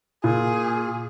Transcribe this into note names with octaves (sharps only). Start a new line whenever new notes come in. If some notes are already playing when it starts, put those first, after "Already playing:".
A#2 G#4